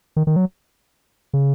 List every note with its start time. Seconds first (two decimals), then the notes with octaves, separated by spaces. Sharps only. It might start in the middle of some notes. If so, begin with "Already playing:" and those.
0.16 D#3
0.27 D#3
0.36 F#3
1.33 C#3